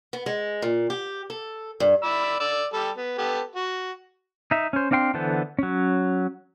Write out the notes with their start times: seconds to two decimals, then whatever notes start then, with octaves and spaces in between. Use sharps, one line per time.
0.13 B3
0.26 G#3
0.62 A#2
0.90 G4
1.30 A4
1.80 G2
2.02 D5 B5 E6
2.40 D5 E6
2.73 G3 G4 A4
2.97 B3
3.18 B3 G4 A4
3.55 F#4
4.51 D#4 E5
4.73 C#4 C5
4.91 C4 D4 F5 G5 C6
5.14 D3 E3 B3 A4 C5
5.59 F#3 C#4